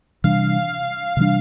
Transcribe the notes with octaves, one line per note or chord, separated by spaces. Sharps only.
C3 E3 G3 D4 F5
C3 E3 G3 D4